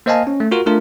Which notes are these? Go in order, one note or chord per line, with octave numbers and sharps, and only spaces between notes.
A#3 C5 D#5 F5 G#5 A5
C#4
A3
F4 F#4 A#4
A3 D4 F4 A#4